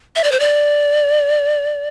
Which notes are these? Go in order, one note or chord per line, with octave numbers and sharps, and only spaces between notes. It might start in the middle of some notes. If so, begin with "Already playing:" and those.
E5
D5
C5
D5